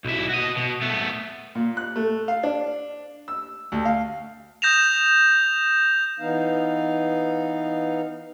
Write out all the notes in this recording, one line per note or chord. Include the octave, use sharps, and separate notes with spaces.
B1 E4
F#4 D#5
B2
A3 B3
A#2
F#6
A3
F5
D4
E6
D2
F5
D#6 G6 A#6 E7 F7
E3 B3 D#4 F5